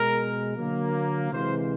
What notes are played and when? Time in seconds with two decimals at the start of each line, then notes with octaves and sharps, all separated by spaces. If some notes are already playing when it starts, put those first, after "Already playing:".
Already playing: B2 G#3 A#4
0.57 D3 F#3 A#3
1.32 C3 E3 G#3 C5